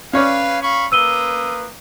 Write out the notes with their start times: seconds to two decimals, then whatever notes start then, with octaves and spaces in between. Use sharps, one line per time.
0.13 C#4 B4 C#5 D5 F5
0.62 F5 B5 C#6
0.92 A#3 B4 D#6 E6 D#7 G7